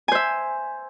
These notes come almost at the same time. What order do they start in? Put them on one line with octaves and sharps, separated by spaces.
G#5 C5 E5